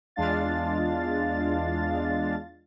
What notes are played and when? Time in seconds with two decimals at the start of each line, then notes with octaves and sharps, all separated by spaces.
0.16 E2 G#3 D4 F4 F5 A6